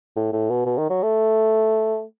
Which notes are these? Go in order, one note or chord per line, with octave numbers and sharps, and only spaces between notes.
A2
A2
B2
B2
D#3
F#3
A3